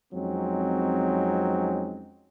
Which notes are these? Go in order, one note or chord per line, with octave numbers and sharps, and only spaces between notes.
F2 F#3 G#3 C4 C#4 D#4